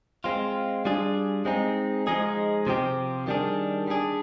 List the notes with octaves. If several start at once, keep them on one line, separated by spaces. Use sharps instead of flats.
G#3 C4 F4
G3 D4 F4 G#4
G#3 C4 D#4 G#4
F3 G#3 D#4 G#4
C3 F3 C4 G4
D#3 G3 D4 G#4
G3 D4 G#4